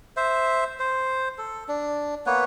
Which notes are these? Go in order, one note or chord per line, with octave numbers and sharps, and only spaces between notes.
C5 E5
C5
A4
D4
A#3 B3 B4 C#5